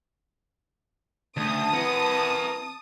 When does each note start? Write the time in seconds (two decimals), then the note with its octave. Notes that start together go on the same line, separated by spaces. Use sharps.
1.37 D2 C#3 A3 G5 A5 D#6
1.73 E3 C4 A#4 F#5